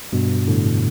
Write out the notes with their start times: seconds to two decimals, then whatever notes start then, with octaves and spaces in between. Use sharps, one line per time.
0.13 G2 B2
0.48 A2 D3